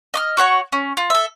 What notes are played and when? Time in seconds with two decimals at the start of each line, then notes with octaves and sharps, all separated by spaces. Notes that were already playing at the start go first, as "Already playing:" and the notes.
0.14 D#5 D6 F6
0.37 F#4 C#5 F#5 C#6
0.72 C#4
0.97 F4
1.10 A4 E5